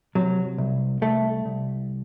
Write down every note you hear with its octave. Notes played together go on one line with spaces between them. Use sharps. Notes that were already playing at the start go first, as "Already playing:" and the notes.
C3 F#3
C2
C2 A3
C2